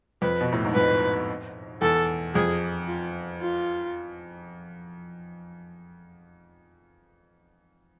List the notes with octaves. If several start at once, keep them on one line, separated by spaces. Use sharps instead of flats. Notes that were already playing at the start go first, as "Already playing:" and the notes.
F2 B4
B2
A2
G#2
F2 B4
E2 A4
F2 G#4
F4
F4